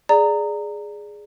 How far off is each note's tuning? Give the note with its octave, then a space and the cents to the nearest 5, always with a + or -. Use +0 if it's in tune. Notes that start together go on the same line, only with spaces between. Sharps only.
G#4 +0 D5 +0 A#5 -20